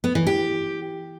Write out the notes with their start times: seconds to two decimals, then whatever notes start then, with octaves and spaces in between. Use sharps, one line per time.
0.04 B3
0.15 E3
0.27 G4